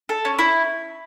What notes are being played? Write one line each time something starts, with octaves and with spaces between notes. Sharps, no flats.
A4
C#4
E4